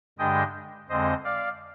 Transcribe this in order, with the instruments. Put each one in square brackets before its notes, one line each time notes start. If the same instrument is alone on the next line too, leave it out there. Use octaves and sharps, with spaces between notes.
[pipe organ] G2 D3 G#3 D4 D#5 G5
F2 D3 G#3 C4 C5 D#5
D5 F5